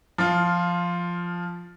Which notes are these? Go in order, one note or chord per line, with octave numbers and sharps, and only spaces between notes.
F3 F4